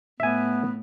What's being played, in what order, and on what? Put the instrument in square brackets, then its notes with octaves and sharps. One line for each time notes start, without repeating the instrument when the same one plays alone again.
[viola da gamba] A2 [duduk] B3 [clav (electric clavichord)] E5 G#5